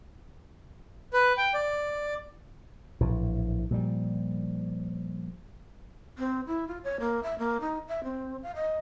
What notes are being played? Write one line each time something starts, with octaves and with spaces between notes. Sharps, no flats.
B4
G5
D5
A#1 A2 E3
A#2 F3 G3
C4
E4
F4
C#5
A#3
E5
A#3
D#4
E5
C4
F5
D#5